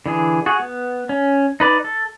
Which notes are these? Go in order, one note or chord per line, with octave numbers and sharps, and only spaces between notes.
D3 E3 G#4
F#4 G#4
B3
C#4
D#4 B4 D5
A4